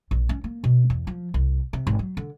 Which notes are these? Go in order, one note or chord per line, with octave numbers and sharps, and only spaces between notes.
A#1
C#4
A#3
B2
E2
F3
C2
C3
G#1
F#3
D3